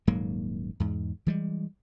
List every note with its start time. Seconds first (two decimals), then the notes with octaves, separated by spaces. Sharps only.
0.07 D#1 G#2 F#3 A#3
0.80 E2 G#2
1.26 E3 G3 G#3